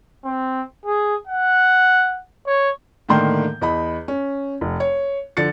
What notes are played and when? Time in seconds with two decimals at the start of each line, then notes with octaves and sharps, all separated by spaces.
0.24 C4
0.86 G#4
1.27 F#5
2.47 C#5
3.09 A2 D3 D#3 A#3 C6 G6
3.61 E2 D#5 B5
4.08 C#4
4.61 F1
4.80 C#5
5.37 D3 F3 A6 C#7